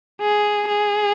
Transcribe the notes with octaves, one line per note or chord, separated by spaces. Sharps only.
G#4
G#4